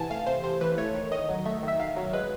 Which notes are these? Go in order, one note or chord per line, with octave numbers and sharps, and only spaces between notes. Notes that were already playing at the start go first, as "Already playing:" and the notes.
Already playing: C3 E3 F#5 G#5 A5
A3 F5
C3 C5
C3 C5
E3 B4
A3 C#5
D#3
D#3 D#5
F#3
A3 E5
D#3
E5
D#3 F5
F#3
G#3 B4